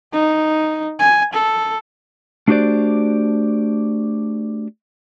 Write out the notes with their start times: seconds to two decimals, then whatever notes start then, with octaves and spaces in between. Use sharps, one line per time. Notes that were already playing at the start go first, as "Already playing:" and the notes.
0.13 D#4
0.99 G#5
1.33 A4
2.48 A3 D4 F#4 G4 C5 D5